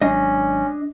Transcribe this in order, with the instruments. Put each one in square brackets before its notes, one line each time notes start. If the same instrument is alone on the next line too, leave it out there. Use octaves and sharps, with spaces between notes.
[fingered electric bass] G#1 F#3 G#3 [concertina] C#4 [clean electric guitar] D4 D#5